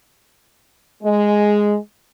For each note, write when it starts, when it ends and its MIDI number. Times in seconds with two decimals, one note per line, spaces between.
1.03 1.76 56